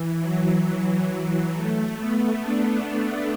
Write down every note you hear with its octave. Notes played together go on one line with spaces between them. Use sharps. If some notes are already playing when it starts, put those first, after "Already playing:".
Already playing: E3
F#3
E3
F#3
A3
B3
D4